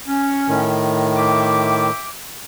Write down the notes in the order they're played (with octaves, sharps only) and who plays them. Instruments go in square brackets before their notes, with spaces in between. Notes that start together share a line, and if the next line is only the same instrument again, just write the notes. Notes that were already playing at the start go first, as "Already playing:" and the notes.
[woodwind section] C#4
[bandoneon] A2 D#3
[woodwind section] E5 G5 D6